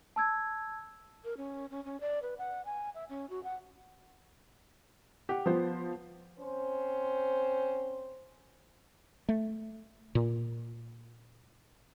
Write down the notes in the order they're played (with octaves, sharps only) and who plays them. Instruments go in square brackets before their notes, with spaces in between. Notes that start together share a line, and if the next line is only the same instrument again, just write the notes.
[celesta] A5 E6 G#6
[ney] A#4
C#4
C#4
C#4
D5
B4
F#5
G#5
E5
C#4
F#4
F#5
[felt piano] G4 F#5
[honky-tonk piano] F3 [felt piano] B3 C5
[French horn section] C4 C#4 C5
[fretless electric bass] A3
A#2